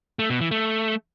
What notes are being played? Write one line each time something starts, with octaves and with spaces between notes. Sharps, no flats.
A3
B2
E3
A3